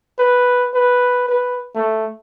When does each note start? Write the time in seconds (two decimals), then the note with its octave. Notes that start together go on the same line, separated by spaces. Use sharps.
0.19 B4
0.74 B4
1.28 B4
1.75 A3